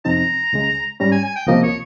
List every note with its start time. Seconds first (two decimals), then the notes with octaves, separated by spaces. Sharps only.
0.05 F2 C3 F3 C4 D#4 A#5
0.53 C#2 C#3 G#3
1.00 G#2 G3 C#4 A#5
1.12 G#5
1.24 G#5
1.36 G5
1.47 C#2 C3 F3 A#3 D#5
1.63 C#5